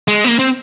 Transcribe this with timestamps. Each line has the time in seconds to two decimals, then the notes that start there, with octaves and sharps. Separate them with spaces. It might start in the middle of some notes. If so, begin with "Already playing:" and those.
0.08 G#3
0.24 B3
0.28 A#3
0.39 C4